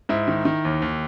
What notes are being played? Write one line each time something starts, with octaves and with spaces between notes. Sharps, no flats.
G#2 E4
D#3
D#3
D#2
D#2